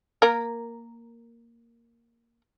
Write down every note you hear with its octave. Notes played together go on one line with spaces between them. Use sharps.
A#3 A#4